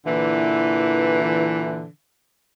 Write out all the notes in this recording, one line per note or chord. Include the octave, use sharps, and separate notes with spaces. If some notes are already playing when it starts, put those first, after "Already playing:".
A#2 D3 E3